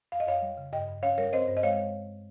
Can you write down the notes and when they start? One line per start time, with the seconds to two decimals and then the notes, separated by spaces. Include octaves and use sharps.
0.12 F2 F5
0.20 D#5
0.27 F2 C#5 F5
0.42 G3
0.57 C#3
0.73 G2 D#5 G5
0.88 G2
1.03 C#4 C#5 F5
1.18 G3 A#4 C#5
1.33 C4 C5 D#5
1.48 G2
1.57 D#5
1.63 G#3 C#5 F5